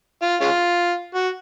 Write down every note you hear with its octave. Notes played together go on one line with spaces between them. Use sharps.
F4
G#3 C#4 F4
F#4